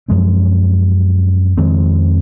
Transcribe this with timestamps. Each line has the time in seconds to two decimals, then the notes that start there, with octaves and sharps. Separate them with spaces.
0.08 F#2 F3 G#3 C4
1.57 F2 D#3 G#3 C4